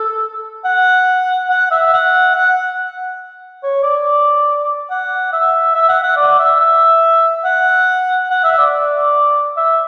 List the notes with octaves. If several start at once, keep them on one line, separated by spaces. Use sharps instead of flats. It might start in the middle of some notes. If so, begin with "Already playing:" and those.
Already playing: A4
F#5
F#5
E5
F#5
F#5
C#5
D5
F#5
E5
E5
F#5
F#5
D5
E5
E5
F#5
F#5
E5
D5
E5